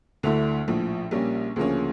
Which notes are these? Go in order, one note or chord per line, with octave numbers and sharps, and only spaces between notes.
D2 D3 A3 E4
A#1 A2 F3
A#1 A#2 G3 A#3 C#4
D2 C#3 F3 A#3 C#4